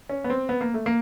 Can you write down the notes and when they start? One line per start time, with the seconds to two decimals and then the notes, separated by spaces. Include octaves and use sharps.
0.09 C#4
0.24 B3
0.30 C4
0.49 B3
0.61 A#3
0.74 A3
0.86 A#3